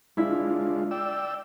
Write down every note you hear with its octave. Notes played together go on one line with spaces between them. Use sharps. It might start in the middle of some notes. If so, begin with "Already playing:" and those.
G#3 D4 E4 F4 B6
D5 G5 E6